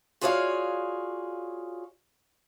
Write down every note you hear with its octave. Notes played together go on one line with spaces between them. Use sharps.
F4 F#4 G#4 C#5 D5 F5